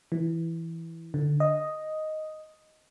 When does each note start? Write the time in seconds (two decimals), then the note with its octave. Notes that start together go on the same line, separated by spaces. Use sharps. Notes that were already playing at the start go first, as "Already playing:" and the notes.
0.12 E3
1.14 D3
1.40 D#5